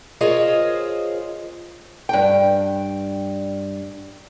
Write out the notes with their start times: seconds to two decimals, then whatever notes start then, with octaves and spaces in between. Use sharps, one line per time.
0.21 F4 G#4 A#4 C5 C#5 D#5
2.09 G2 G5